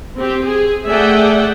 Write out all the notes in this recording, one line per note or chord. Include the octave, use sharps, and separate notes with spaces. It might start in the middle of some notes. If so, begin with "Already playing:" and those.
C4 G4
G#4
A3 G#4 D5 E5 F#5 G5